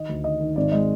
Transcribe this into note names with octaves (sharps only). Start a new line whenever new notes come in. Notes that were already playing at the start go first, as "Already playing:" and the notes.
Already playing: D#3 D#5
D2
D#3 D#5
D#3
G#1 D5
G#3 D#5